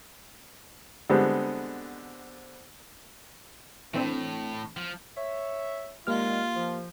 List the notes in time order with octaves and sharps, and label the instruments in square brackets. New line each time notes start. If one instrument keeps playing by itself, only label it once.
[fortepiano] D3 G3 G#3 B3 C4
[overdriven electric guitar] A2 [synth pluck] E3 C4 D4
[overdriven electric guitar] F3
[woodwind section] C#5 E5
[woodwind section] A#2 D#3 G#3 [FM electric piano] A#3 G4 F6 [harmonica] F4
[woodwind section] F3